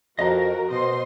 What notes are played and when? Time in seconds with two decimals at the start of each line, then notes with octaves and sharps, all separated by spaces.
0.19 F2 F#4 A#4 D#5 F5 A#5
0.71 B2 C5 D#5 C6